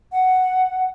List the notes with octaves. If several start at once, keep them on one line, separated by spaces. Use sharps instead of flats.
F#5